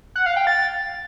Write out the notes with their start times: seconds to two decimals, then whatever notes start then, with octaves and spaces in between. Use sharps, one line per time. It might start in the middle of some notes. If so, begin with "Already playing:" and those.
0.16 F#5
0.26 F5
0.36 G5
0.47 A6